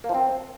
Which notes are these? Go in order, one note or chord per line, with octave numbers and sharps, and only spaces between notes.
A#3
F3
C4